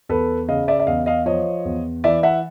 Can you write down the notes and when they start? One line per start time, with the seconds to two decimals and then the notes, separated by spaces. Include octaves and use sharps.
0.09 E2 A4 B4
0.48 C#3 D#5 F5
0.68 D5 E5
0.80 E5
0.87 E2 D#5 F5
1.06 D#5 F5
1.26 F3 C#5 D#5
1.65 E2
2.04 E3 D5 E5
2.23 E5 F#5